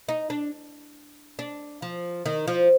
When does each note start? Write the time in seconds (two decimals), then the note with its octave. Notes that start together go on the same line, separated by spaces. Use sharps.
0.09 D#4
0.30 D4
1.39 D4
1.82 F3
2.26 D#3
2.47 F3